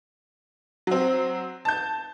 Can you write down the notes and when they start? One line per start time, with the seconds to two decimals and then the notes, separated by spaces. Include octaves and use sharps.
0.87 F#3 C4
1.65 A5 G6